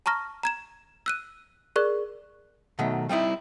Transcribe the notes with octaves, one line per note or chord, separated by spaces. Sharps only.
A5 A#5 C#6 F6 A#6
A#5 G#6 E7
E6 F#6 D#7
G#4 A#4 D5 C#6 F#6
B2 D#3 F#3 A3
G3 C4 D#4 E4